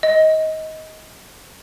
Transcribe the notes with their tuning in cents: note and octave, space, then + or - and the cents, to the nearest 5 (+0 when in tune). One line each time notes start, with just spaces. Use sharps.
D#5 +20